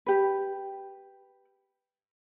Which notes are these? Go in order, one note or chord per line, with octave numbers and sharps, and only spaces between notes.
G4 B4